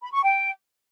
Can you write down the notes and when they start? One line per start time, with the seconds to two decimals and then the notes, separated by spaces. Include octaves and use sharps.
0.02 B5
0.12 C#6
0.23 G5